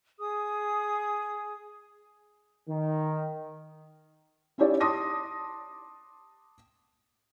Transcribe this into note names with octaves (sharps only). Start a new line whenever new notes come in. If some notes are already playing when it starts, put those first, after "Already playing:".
G#4 D#6
D#3
C#4 D#4 E4 G4 C#5 D5
A5 C6 D6 D#6 A#6